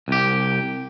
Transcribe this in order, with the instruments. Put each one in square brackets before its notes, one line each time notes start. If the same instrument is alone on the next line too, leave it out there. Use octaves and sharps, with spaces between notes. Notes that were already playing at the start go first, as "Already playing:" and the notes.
[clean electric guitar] C2 G4